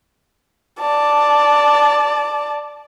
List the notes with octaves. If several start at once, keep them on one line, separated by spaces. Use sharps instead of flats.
D5 A5